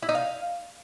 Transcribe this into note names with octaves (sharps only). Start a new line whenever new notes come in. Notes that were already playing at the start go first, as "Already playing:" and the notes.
E4
D#4
F5